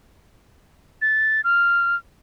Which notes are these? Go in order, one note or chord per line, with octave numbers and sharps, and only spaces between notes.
A6
F6